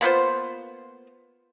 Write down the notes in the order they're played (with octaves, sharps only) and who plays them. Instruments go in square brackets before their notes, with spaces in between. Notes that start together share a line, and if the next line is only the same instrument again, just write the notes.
[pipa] A#3 B3 F4 C5